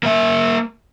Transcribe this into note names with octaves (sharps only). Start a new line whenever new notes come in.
A#3 E5